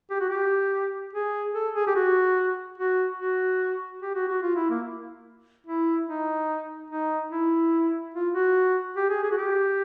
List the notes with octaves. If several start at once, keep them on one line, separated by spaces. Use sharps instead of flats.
G4
F#4
G4
G#4
A4
G#4
G4
F#4
F#4
F#4
G4
F#4
F#4
F4
E4
A#3
E4
D#4
D#4
E4
F4
F#4
G4
G#4
G#4
F#4
G4